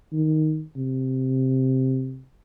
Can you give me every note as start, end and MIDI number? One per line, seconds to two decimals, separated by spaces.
0.13 0.63 51
0.76 2.22 48